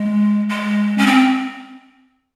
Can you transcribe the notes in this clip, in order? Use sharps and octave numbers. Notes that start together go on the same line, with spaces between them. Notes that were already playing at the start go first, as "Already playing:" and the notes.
Already playing: G#3
G#3
C#4
C4